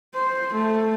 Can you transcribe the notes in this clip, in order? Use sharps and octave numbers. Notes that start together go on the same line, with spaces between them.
C5
A3